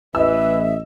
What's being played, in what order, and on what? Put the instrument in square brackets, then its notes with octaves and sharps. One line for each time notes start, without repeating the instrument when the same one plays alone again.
[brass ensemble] A1 [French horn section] E3 B4 [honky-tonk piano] D#5 E6 [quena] E5